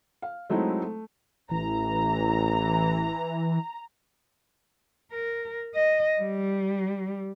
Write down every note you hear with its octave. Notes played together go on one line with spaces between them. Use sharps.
F5
F#3 G#3 A3 C4 D#4 E4
A3
A1 E3 A#5
A#4
D#5
G3